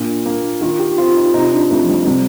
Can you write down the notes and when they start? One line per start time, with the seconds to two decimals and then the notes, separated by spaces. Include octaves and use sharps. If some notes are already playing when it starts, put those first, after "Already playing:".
Already playing: A#2 D4
0.26 A#3
0.61 D#3 F4
0.80 G4
0.98 C4 F4
1.17 D#4
1.34 C3 D#4
1.52 D4
1.70 F2 A3
1.84 F3
1.89 G3
2.07 C3 G3